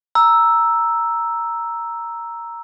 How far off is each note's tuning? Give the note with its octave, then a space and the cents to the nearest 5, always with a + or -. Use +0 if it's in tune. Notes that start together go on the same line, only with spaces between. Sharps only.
A#5 +0 E6 +0